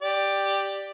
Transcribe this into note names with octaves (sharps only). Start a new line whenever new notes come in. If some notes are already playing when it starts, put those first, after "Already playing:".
G4 D5